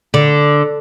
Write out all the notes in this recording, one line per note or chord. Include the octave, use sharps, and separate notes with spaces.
D3